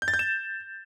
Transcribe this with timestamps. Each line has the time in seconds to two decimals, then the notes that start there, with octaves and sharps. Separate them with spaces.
0.02 G6
0.08 A6
0.14 G6
0.19 E7